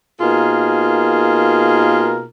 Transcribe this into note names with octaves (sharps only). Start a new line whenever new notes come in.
B2 A#3 D#4 F4 G#4 A#4